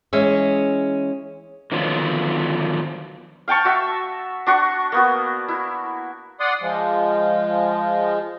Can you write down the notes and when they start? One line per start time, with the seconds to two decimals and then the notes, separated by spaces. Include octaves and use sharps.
0.13 E3 G#3 C#4 G#4 E5
1.72 D3 D#3 F3 F#3 B3 F4
3.48 F5 G5 A5 C#6
3.65 F#4 E5
4.47 D4 F#4 C#6
4.92 A#3 B3 F#4
5.48 E4
6.40 D5 F#5 C6 D#6
6.62 F3 G#3